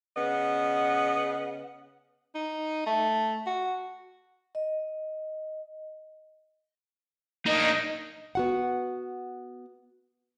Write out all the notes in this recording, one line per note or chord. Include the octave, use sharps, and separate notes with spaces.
C#3 B3 D#5 F#5
D#4
A3
F#4
D#5
A#3 D4 D#4 D#5
B3 F#4 F#5